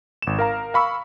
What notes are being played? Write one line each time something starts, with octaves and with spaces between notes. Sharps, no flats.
G#1 E7
A#4 F5 A#5
F5 B5 C#6 E6